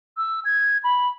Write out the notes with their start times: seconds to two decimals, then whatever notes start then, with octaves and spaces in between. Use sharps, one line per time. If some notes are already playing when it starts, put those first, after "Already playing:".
0.17 E6
0.45 G#6
0.84 B5